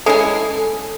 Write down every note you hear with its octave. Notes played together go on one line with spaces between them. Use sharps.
G#3 C#4 E4 G#4 A4